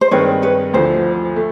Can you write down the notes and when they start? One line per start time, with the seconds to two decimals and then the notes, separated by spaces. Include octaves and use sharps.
0.01 C5
0.11 G2 D#3 G#3 C4 B4 C#5
0.42 B4 C#5
0.74 D2 D3 F3 C5
1.36 A3